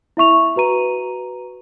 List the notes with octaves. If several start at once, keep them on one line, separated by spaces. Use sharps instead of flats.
E4 E5 C#6 F7
F#4 B4 A#5 D#7